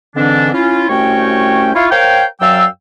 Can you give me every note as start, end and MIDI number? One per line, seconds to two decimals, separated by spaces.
0.16 0.49 44
0.16 0.49 50
0.16 0.49 52
0.16 0.49 60
0.16 0.49 62
0.53 0.87 61
0.53 0.87 64
0.53 0.87 65
0.89 1.71 36
0.89 1.71 57
0.89 1.71 61
0.89 1.71 66
0.89 1.71 73
0.89 1.71 79
1.75 1.91 64
1.75 1.91 65
1.75 1.91 73
1.75 1.91 77
1.91 2.24 70
1.91 2.24 72
1.91 2.24 73
1.91 2.24 77
1.91 2.24 79
2.41 2.65 42
2.41 2.65 54
2.41 2.65 74
2.41 2.65 77
2.41 2.65 79
2.41 2.65 88